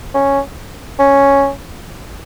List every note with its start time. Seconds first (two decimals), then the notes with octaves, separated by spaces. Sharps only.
0.14 C#4
0.99 C#4